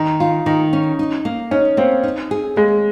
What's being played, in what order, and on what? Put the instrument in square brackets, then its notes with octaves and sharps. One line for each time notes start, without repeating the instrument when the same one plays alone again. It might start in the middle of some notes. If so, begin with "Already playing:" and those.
Already playing: [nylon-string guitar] D#3 [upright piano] D#4
[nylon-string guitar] F4
[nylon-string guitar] D#3 [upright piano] D#4
[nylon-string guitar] C#4
D#4
A#3
[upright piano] C#4 [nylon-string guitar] D#4
[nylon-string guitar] A#3 [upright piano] C4
[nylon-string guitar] D#4
G#4
[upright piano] G#3 [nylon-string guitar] A#3